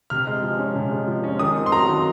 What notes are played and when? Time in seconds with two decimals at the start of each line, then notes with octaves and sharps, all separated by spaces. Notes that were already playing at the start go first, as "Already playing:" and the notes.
0.10 C3 F6
0.27 G#3
0.43 F3
0.59 C#4
0.75 C3
0.91 G#3
1.07 F3
1.24 C#4
1.39 D#3 D#6
1.56 C4
1.66 C6
1.72 F#3 A#5
1.89 D#3